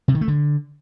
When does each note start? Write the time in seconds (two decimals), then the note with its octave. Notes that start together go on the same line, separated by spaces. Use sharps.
0.08 C3
0.15 D#3
0.21 A3
0.28 D3